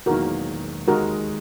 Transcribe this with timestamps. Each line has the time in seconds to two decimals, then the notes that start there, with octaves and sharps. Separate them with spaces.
0.06 E1 E2 D#3 F#3 A#3 F#4 A#4
0.88 D#2 D#3 G#3 D#4 F#4 A#4